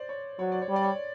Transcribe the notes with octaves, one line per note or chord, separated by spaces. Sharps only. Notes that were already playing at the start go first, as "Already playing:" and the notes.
Already playing: C5 D5
C#5
F#3 C#5
D5
C#5
G3
D5
C#5